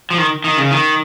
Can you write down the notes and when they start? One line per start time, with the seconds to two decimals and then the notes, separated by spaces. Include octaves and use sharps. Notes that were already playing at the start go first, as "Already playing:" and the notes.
0.10 F3
0.18 D#3
0.44 D#3
0.57 C#3
0.71 D#3